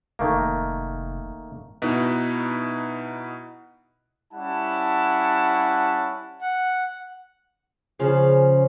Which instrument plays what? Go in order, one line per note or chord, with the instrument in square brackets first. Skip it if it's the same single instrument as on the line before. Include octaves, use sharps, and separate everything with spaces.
[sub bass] F1 [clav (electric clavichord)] D#3 A3 A#3
[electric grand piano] B2 D#4 E4 B4
[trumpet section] G3 C#4 E4 F#5 A5
[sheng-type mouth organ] F#5
[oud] C#3 F3 C#4